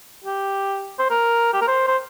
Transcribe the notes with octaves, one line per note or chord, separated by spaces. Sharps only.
G4
C5
A#4
G4
A#4
C5
C5